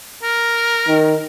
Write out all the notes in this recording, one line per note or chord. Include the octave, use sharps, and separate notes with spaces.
A#4
D#3